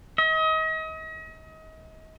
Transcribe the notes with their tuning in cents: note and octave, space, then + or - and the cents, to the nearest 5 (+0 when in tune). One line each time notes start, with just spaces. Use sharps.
D#5 +35